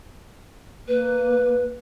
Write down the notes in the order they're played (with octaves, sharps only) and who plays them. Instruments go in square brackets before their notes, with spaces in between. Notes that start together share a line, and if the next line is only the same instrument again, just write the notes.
[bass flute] A#3 [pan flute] B4